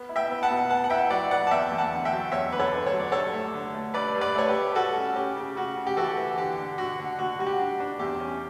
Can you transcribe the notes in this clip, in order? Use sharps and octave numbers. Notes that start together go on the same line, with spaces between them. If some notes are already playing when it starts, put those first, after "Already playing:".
Already playing: B3
E4
E5 G5
B3
F#5 A5
B2
B3 F#5 A5
F#5
E4 E5 G5
F#3 D5 F#5
B3 D5 F#5
A5
E2 E5 G5
E2
F#5 A5
D3
E5 G5
F#3
E2 C#5 E5
D3 B4
A4 C#5
D3
C#5
F#3
D5
G2 A4 C#5
A3
D3
A3
G2 B4 D5
G2
B4 D5
A3 C#5
G4 B4
A3
G3 F#4 A4
C#4
C#4 G4
C#3
C#3 F#4
C#3
G4
E3 F#4 A4
E3
D3 G4
D3
D3 F#4
D3
D3 F#4
G3 F#4
G4
D4
D4
E2 G4
C#4